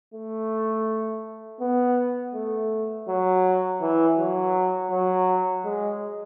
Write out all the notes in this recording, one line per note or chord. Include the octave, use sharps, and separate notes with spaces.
A3
B3
A3
F#3
E3
F#3
F#3
G#3